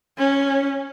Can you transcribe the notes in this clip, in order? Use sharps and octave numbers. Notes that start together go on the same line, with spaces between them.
C#4